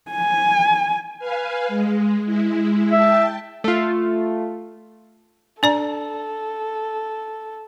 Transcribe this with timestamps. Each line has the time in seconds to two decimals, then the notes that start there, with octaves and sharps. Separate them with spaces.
0.11 G#5
1.19 B4 F5 G#5
1.68 G#3
2.25 G#3 E4
2.92 E5 G5 A5
3.64 A3 F4
5.63 D4 A4 D5 A#5